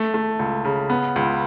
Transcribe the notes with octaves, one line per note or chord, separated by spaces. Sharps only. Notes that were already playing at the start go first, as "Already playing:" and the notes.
Already playing: A3
A3
C#2
C#3
B3
C#2